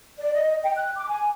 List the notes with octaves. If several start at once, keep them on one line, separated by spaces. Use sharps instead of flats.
D5
D#5
G5
F#6
D6
G#5